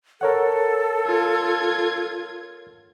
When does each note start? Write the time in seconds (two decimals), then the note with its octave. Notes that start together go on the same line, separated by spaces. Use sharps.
0.21 A4 A#4 C#5 F#5
1.06 F4 G#6